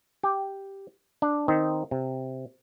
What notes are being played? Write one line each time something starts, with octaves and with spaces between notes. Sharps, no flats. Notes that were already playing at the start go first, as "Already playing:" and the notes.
G4
D4
D#3 C4 D#4
C3